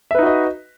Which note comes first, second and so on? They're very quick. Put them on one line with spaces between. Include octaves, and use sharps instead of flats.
E5 B4 D#4 F#4 D#5